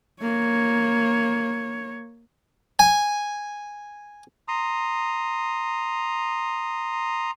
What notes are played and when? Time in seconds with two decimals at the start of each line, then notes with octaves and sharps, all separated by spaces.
0.22 A#3 C#5
2.79 G#5
4.48 A#5 C6 D#6